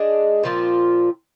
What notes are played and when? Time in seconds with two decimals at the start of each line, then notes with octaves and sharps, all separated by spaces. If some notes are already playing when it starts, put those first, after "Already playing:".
Already playing: G#3 D4 G#4
0.44 A#2 F3 C4 F4